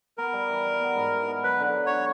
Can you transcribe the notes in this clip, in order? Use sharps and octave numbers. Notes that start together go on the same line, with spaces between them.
B3 A#4
G3
E3
G3
B3
G#2
E3
B3
F#3 B4
D3
F#3
D3 C#5